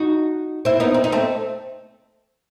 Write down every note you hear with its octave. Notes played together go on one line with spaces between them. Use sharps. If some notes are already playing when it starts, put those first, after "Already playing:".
Already playing: D#4 F#4
C4 E4
B3 D#4
C4
D#4
A3 C4